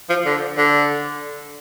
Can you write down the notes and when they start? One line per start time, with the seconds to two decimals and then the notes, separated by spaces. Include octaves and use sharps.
0.09 F3
0.25 D3
0.57 D3